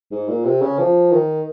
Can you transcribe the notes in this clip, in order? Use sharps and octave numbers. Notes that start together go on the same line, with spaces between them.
G#2
A#2
C3
C#3
F3
D#3